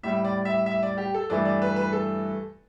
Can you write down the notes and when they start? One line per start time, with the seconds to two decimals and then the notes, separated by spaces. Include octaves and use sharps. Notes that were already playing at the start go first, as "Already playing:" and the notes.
0.03 A2 G3 E5
0.25 D5
0.45 E5
0.66 E5
0.83 D5
0.97 G4
1.14 A4
1.29 G2 E3 A3 D5
1.45 D5
1.62 B4
1.76 B4
1.93 A4